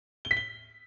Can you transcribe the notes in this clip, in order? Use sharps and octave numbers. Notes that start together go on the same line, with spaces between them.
G7
B6
G7